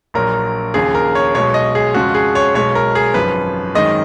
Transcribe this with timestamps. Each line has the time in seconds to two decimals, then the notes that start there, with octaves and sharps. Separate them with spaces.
0.14 A#1 A#2 F#3 A#4
0.74 D#2 C#3 F3 G#4
0.95 A#4
1.15 C#5
1.35 B1 B2 G#3 C#5
1.54 D#5
1.75 G#4
1.94 F2 C#3 F3 G#3 F#4
2.15 G#4
2.35 C#5
2.54 B1 B2 G#3 C#5
2.75 A#4
2.95 G#4
3.14 G#1 F#2 F3 B4
3.75 G#1 F#2 D#3 G#3 D#5